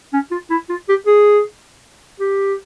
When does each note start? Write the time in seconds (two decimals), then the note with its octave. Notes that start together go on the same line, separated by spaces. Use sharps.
0.14 C#4
0.31 F4
0.50 E4
0.70 F4
0.89 G4
1.07 G#4
2.20 G4